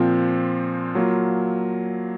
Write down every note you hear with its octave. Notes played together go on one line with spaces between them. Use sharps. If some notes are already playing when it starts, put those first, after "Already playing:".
Already playing: A#2 F3 C4 F4
F#3 A#3 F4